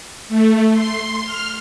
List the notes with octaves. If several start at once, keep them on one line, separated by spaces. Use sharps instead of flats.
A3
C6
F6